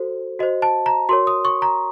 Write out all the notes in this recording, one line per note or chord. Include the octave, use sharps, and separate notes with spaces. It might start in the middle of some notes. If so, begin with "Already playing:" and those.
Already playing: F#4 A4 C5
F#4 C5 D#5
A5
A#5
F#4 A#4 C#5 C6
D#6
C#6
A#5